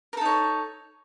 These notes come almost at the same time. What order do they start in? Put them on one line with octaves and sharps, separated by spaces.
A#4 A4 D#4 C#5